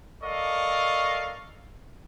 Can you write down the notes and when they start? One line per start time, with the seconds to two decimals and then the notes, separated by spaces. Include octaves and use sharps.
0.22 A4 A#4 D5 D#5 F5 C#6